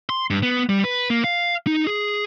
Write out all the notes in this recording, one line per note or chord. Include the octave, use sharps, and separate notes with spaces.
C6
G2
B3
G3
B4
A#3
F5
D#4
G#4